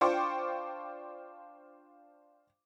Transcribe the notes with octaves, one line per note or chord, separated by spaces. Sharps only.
D4 F4 C5 G5 C#6 D6